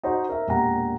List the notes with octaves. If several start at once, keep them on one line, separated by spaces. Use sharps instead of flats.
D#4 F#4 C5 D#5
A#4 E5
E1 A#2 G4 F#5 A#5